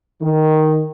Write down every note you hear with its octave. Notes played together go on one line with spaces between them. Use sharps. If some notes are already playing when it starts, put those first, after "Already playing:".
D#3